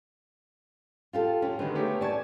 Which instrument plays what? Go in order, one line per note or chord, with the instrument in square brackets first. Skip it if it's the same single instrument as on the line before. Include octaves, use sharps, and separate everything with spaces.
[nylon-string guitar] F4 G4 A4
[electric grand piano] C#4 [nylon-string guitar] G4
[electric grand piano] D3 D#3 G#3 [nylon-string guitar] B3 A#4
[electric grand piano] A3 G4 C#5
[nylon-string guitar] D5 A5 [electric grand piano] G#5 C#6 G#6